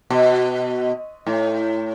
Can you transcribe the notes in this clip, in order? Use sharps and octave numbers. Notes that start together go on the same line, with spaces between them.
B2
A2